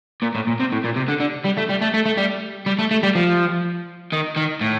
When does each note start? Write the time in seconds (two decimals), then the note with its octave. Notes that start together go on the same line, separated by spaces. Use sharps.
0.22 A#2
0.35 A2
0.47 A#2
0.60 C3
0.72 A2
0.84 A#2
0.96 C3
1.08 D3
1.20 D3
1.44 G3
1.57 A3
1.69 G3
1.81 A3
1.94 A3
2.06 A3
2.18 G3
2.66 G3
2.79 A3
2.91 A3
3.03 G3
3.15 F3
4.13 D#3
4.37 D#3
4.61 A2